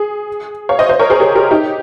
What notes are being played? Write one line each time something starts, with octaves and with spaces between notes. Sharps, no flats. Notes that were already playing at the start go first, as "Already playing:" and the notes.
Already playing: G#4
C#5 F5
C5 D#5
C5 D#5
A#4 C#5
G#4 C5
G4 A#4
G4 A#4
D#4 G4